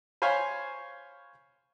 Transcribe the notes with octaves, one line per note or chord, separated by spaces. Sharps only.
C5 C#5 F5 G#5 B5 C6